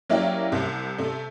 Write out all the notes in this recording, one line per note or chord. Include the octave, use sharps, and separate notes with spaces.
F#3 A#3 C#4 E4 G4 D5
C2 C3
C3 A3